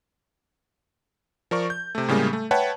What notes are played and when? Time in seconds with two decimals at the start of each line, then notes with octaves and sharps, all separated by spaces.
1.51 F3 A#4 D5 C#6
1.70 G6
1.95 C3 A3
2.09 A2 C#3 G3 G#3 A#3
2.33 A3
2.51 B4 C#5 E5 F#5 G5 A5